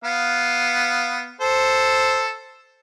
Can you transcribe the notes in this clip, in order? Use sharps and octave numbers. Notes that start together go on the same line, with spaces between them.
B3 F5
A4 C5